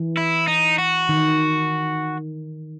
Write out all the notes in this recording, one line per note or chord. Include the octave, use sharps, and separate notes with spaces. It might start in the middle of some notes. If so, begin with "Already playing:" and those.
Already playing: E3
E4
D#4
F#4
D#3